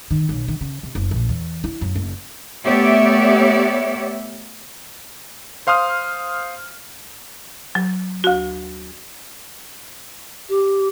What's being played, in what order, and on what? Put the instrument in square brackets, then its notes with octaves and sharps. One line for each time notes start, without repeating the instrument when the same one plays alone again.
[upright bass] D#3
B1
D#3
C#3
C3
F#1
A#1
E2
E4
F#2
F#1
[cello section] A3 B3 G4 C#5 D5 E5
[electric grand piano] C5 F5 C6 D#6 F6
[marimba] F#3
D2 F#4
[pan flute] G4